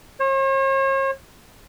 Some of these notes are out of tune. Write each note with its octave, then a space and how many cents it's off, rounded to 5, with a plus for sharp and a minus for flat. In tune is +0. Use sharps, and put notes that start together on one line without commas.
C#5 -45